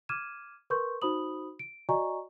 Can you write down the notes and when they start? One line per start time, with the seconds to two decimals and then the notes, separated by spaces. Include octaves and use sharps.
0.09 D6 F6 G#6 D#7 E7
0.70 A#4 B4 C6 C#6 G6
1.02 D#4 F#4 C5 B5 D#6 F#7
1.59 D7
1.89 F#4 D5 D#5 G#5 A#5 C#6